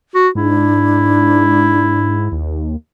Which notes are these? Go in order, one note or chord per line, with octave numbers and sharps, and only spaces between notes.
F#4
G#2 D4 E4
D#2